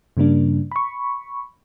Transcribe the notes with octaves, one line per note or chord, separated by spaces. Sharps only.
G2 C#3 G3 A#3 D4
B5 C#6